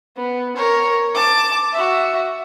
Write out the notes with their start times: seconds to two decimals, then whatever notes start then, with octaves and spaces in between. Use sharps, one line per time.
0.16 B3
0.56 A#4 C#5
1.15 A5 D6
1.72 F#4 E5